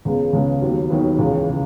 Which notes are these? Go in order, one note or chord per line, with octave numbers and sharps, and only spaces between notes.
C#2 C#3 G#3 B3
C#2 C#3 G#3 B3
D#2 D#3 F#3 B3
D#2 D#3 F#3 B3
C#2 C#3 E3
C#3